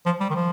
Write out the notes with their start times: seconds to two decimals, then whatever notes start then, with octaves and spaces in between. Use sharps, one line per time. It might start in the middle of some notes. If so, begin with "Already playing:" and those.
0.06 F3
0.20 G3
0.30 D#3
0.35 F3